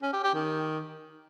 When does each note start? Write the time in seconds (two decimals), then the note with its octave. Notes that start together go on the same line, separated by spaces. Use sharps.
0.02 C#4
0.13 G4
0.24 G4
0.34 D#3